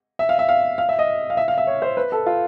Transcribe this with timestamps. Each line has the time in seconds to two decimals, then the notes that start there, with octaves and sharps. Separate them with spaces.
0.19 E5
0.29 F5
0.39 E5
0.49 F5
0.78 F5
0.89 E5
0.99 D#5
1.30 F5
1.37 E5
1.48 F5
1.58 E5
1.67 C#5
1.82 C5
1.97 B4
2.12 A4
2.26 F4